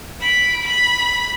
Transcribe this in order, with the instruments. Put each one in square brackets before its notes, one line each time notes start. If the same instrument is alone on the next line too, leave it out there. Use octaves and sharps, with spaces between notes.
[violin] B5 D7
B5